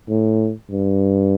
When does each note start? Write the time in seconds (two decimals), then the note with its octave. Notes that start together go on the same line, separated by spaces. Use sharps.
0.09 A2
0.70 G2